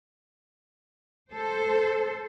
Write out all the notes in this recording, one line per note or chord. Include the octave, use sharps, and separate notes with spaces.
A4 C5